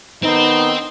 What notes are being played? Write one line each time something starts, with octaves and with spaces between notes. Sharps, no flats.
D#3 B3 C4 D#4